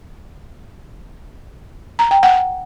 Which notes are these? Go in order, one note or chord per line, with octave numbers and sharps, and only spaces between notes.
A#5
G5
F#5